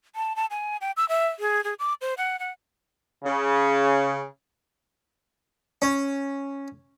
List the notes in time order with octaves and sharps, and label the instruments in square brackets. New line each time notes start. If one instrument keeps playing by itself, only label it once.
[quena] A5
A5
G#5
G5
E6
E5
G#4
G#4
D6
C5
F#5
F#5
[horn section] C#3
[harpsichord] C#4